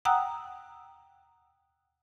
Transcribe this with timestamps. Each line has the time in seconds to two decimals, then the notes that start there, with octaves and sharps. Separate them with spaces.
0.05 F#5 G5 A#5 D#6 E6 F#6